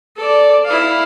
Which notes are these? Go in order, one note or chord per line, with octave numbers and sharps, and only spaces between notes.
A4 D5
E4 F5